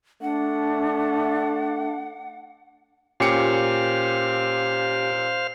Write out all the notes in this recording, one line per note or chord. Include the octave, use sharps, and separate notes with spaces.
A3 D4 F#5
A#2 C#4 G4 C5 F5 C#7